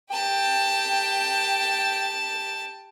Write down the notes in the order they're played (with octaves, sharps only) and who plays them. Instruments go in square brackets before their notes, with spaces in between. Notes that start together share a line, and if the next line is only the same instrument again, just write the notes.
[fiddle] G4 A5 [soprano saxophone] G5